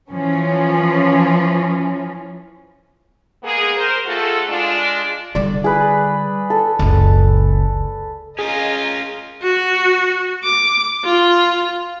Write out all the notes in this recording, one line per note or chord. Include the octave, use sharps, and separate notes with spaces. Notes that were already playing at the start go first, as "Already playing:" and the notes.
E3 F3 C#4
G#3 A#3 B3 G#4
A#4 C5
A3 F4 F#4 G#4 A4
G#3 D4 F4
D3 G3 D5
G#4 B4
A4
F#1 C#2
C#4 F4 G#4 A#4 D#5 F5
F#4
D6
F4